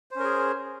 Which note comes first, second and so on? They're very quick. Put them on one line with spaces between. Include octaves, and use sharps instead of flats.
C5 C#4 A#4 G#4